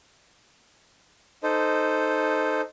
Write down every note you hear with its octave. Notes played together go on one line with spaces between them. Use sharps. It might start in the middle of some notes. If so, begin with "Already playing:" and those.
D#4 A4 C5